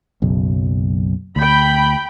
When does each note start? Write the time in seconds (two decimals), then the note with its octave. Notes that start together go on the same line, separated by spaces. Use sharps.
0.22 F#1 B1
1.36 D2 G5 B5